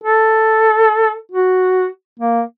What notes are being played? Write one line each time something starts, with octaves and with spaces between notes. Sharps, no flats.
A4
F#4
A#3